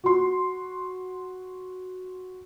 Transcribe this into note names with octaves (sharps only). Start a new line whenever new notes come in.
F#4 C6